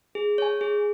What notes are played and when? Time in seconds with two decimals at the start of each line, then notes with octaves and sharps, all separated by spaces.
0.15 G#4
0.38 C#5 G#5
0.61 G#4